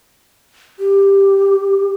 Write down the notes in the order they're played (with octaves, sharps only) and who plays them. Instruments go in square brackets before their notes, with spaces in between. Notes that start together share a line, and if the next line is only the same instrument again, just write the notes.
[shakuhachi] G4